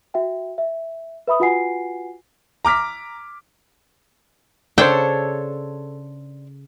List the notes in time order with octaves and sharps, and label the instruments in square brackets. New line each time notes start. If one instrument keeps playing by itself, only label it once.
[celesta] F#4 E5 G5
E5
B4 E5 B5 D#6
F4 F#4 B4 F#5 G#5 C7
[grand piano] A#5 D6 F6 B6
[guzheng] C#3 [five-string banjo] D4 C5 [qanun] A4 C#5 [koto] G5